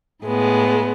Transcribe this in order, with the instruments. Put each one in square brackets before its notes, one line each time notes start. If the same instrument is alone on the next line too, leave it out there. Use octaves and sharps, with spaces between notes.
[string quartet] A2 G#3 B3